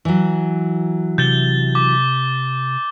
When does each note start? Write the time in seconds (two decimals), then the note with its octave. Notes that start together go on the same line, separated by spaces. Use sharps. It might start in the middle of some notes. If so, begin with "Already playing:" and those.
0.05 E3 F#3
1.18 C3 G6 A6 G7
1.75 D6